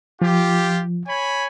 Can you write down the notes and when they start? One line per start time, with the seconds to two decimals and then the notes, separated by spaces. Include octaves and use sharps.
0.22 F3 F4 G4
1.07 C#5 G#5 B5